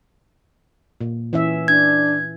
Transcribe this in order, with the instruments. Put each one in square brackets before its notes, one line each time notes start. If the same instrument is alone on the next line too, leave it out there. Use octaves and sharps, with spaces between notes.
[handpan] A#2
E3 C#4 E5
[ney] D4 [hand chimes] G#6